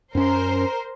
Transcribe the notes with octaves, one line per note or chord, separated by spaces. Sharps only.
F#2 C#4 A#4 C5